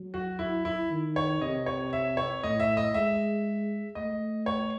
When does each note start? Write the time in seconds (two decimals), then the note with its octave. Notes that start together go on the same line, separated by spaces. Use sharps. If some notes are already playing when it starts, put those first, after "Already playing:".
Already playing: F#3
0.14 F#4
0.39 E4
0.65 E4
0.90 D#3
1.16 C#5
1.41 C3 D#5
1.66 C#5
1.93 E5
2.17 C#5
2.43 A2 D#5
2.60 E5
2.77 D#5
2.94 G#3 E5
3.95 A3 D#5
4.46 C#5